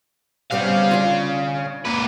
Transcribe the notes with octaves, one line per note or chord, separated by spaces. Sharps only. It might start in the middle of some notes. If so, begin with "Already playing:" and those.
C3 G3 B3 C#4 F5
D4 F4
A#3 B4